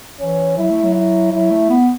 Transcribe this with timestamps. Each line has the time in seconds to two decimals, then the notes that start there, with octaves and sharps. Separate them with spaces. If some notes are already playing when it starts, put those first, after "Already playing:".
0.20 E3 C#4
0.57 F#3 E4
0.70 A3
0.84 F#3
0.95 E4
1.32 F#3 E4
1.51 A3
1.69 B3